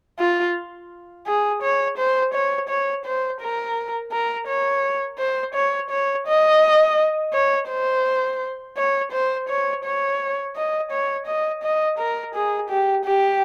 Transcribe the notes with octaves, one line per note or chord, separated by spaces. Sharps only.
F4
G#4
C#5
C5
C#5
C#5
C5
A#4
A#4
C#5
C5
C#5
C#5
D#5
C#5
C5
C#5
C5
C#5
C#5
D#5
C#5
D#5
D#5
A#4
G#4
G4
G4